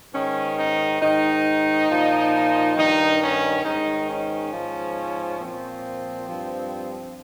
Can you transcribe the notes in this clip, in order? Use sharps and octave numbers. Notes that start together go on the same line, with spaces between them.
G#2 D#3 C#4
D#4
G#2 D#3 D#4
A#2 F3
G2 D#3 D#4
C#4
G#2 D#3 D#4
C#4
G#2 F3
A#2 C4
F3
G2 F3